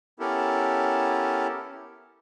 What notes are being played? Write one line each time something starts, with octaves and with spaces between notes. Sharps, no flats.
B3 C#4 E4 G4 A4 A#4